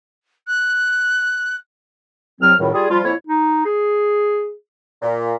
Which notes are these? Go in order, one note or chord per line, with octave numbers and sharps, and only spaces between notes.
F#6
C2 F#3 C4 F6
C#2 F#2 A2 D#3 G3
G3 F4 G#4
F3 G3 F4
F2 A#3 E4 C#5
D#4
G#4
A#2